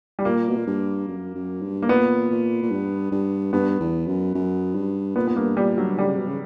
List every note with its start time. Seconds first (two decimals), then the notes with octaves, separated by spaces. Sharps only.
0.19 G3
0.25 A#2 A#3
0.48 B2
0.57 A#2
0.67 G2
1.08 F#2
1.35 F#2
1.62 G2
1.82 A#3
1.89 A#2 B3
2.31 A#2
2.62 A#2
2.71 G2
3.12 G2
3.53 G2 B3
3.80 E2
4.07 F#2
4.35 F#2
4.75 G2
5.16 A#2 B3
5.27 B3
5.36 G2 A#3
5.57 A#2 G3
5.78 G2 F#3
5.98 D3 G3
6.08 C#3
6.18 B2
6.28 C#3